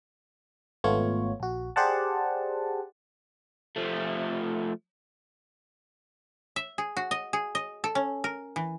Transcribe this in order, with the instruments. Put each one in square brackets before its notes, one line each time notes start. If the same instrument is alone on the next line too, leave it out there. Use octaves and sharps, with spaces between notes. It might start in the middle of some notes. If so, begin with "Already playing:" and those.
[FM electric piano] G#1 A3 B3 F4 C#5
A#1 F#4
G4 G#4 C5 D5 F#5 A5
[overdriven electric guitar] F3 A3
[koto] E5
G#4
F#4
D#5
G#4
D#5
A4
C#4
A#4
E3